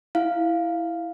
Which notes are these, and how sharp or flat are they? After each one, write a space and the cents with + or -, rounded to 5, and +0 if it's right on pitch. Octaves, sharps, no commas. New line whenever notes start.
E4 +0 F5 +0